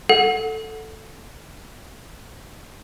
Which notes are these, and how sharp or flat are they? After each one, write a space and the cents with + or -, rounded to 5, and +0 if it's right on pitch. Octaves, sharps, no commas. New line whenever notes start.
A4 +0 F#5 -15